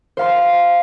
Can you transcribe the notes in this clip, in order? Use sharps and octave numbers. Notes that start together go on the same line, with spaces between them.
C5 F5 C6